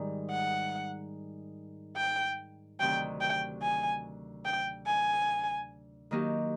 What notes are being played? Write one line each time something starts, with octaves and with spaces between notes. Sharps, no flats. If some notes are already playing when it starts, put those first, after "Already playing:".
Already playing: G#2 D#3 G3
F#5
G5
D2 C3 D#3 F#3 G5
G5
G#5
G5
G#5
D#3 F#3 A#3 D#4 G4